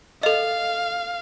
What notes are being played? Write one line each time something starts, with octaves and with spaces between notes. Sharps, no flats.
A4 D#5 F5